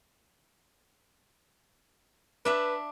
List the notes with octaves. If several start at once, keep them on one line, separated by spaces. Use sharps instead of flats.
D4 B4 E5